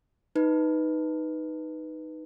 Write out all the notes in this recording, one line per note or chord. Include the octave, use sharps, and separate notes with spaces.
D#4 B4